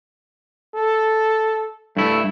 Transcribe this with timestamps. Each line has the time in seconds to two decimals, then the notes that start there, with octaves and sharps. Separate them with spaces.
0.75 A4
1.97 G2 A3 E4